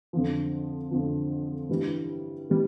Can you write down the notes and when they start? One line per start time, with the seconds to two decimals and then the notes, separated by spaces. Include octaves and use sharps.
0.13 F2 D3 F3
0.91 F2 D3 F3
1.69 G2 E3 G3
2.49 E3 G3